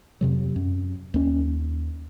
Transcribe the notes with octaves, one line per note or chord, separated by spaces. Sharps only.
F2 C3 F#3
F#2
D#2 C#4